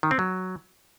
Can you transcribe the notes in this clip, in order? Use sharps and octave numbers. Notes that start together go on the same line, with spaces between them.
D#3
C4
F#3